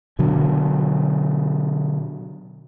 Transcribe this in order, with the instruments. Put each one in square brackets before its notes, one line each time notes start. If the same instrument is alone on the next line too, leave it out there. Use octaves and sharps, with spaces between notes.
[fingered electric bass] B2 D3 F#3